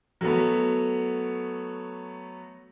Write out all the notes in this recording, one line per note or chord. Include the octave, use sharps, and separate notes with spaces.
F#3 A3 B3